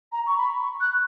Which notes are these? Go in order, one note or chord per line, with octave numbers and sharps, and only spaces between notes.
A#5
C#6
B5
C#6
F#6